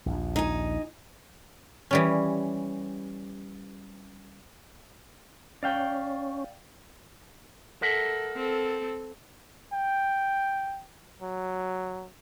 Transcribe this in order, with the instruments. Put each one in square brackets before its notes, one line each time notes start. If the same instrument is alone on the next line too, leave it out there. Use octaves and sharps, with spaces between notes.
[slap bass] A#1 D#2
[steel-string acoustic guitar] D#4 G#5
[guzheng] E3 G3 C#4
[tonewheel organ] C#4 [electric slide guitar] D5 F5 G5
[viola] A4 [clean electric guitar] A#4 E5 F#5
[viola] C4 A4
[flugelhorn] G5
F#3